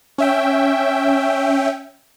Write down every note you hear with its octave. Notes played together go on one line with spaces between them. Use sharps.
C#4 E5 G5